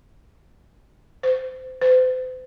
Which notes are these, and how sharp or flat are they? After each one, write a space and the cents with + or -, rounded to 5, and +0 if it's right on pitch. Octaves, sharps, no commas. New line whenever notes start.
C5 -25
C5 -40